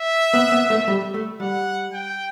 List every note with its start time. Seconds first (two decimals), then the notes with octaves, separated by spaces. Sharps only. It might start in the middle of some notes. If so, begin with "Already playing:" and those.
Already playing: E5
0.34 B3
0.52 B3
0.70 A3
0.88 G3
1.14 A3
1.40 G3 F#5
1.93 G5